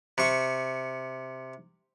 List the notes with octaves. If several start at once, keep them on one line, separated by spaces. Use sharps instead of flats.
C3 C#6